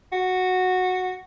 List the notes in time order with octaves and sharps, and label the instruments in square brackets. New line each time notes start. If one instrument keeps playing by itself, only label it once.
[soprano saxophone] F#4